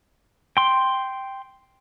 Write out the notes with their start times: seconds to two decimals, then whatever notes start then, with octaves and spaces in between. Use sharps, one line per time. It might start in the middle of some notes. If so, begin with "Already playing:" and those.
0.57 G5 C6